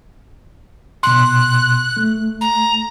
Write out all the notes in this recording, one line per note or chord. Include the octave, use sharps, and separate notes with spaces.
B2 C6 F#6
A3
A#5